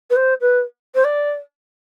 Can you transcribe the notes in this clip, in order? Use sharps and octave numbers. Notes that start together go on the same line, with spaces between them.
B4
C5
B4
C5
D5